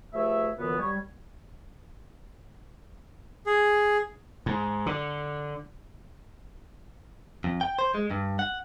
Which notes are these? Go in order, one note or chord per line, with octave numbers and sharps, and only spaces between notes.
G2 F3 A3 G#4 E5
F#2 A#2 D3 E3 B3
G3 C#5
G#4
G#2
D3
F2
G5
C5
G#3
G2
F#5